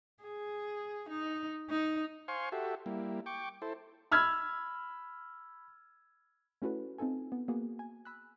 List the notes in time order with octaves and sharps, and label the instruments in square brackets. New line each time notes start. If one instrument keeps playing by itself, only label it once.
[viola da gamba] G#4
D#4
D#4
[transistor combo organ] C5 F5 G#5 C6 C#6
F#4 G4 A4 E5
G3 A#3 E4
G5 C#6 D6
E4 A4 C5
[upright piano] B5 E6 F6 G#6
[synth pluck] A3 C#4 E4 F#4 A4 B4
C4 D#4 F4 A4 G#5
B3
A#3 B3 F#4 G#4
G#5
G#5 B5 E6 F#6